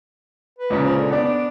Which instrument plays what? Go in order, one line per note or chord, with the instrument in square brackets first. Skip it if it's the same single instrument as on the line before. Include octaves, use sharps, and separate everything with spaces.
[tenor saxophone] B4
[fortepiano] C#2 A#2 C#3
[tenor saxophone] F3
D3
[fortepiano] B3 D5 [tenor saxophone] D4
[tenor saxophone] D4